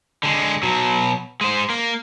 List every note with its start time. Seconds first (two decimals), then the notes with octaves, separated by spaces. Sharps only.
0.23 D3 G#3
0.63 B2 F#3
1.41 G#3 C5
1.70 A#3